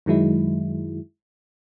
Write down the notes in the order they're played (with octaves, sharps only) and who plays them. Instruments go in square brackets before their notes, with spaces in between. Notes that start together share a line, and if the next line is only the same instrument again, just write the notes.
[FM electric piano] F#2 D#3 F#3 G#3 E4